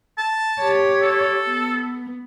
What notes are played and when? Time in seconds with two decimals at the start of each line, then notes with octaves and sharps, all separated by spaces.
0.18 A5
0.61 G4 C#5
1.02 A4
1.48 B3